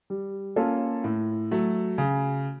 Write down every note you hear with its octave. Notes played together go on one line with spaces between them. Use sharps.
G3
A#3 C#4 F4 A4
A2
F#3 A3
C#3